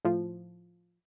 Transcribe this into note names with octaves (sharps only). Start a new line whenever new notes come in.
A2 F3